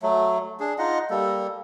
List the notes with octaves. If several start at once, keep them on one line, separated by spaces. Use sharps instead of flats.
F#3 A3
D4 G#4
D#4 F4 D#5 F#5
G3 A#3 A4